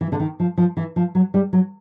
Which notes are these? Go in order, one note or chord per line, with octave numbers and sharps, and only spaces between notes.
E3
D3
D#3
F3
F3
E3
F3
F#3
G3
F#3